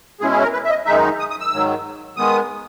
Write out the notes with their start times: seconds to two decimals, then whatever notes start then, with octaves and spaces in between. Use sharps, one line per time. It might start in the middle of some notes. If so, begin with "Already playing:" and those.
0.21 B2 G#3 C#4 E4 G#4
0.32 G#4
0.43 A#4
0.53 B4
0.65 E5
0.70 D#5
0.86 F#2 D#3 G#3 D#4 E5
1.19 D#6
1.30 D#6
1.40 E6
1.52 G#2 D#3 F#3
2.17 D#3 G#3 B3 D#6